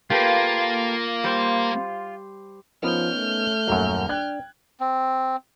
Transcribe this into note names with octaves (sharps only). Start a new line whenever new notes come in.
A#3 F4 G4 A4 B4
G3 C5
F3 B3 C#4 D#4 A#4 F6 G6
A3
D#1 F#2 F#3 A#3
D4 G5 F#6 G#6
C4